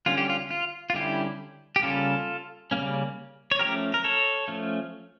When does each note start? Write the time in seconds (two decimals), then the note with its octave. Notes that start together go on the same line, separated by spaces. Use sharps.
0.06 D3 G3 C#4 F4
0.17 G4
0.29 F4
0.51 F4
0.90 F4
0.95 D3 G3 C#4 E4 G4
1.76 G4
1.82 C#3 G3 A#3 C#4 F4 A4
2.71 C#3 G3 A#3 C#4
3.51 C#5
3.59 F3 A3 C#4 G4 A#4
3.94 A#4
4.04 A4 C#5
4.48 F3 A3 C#4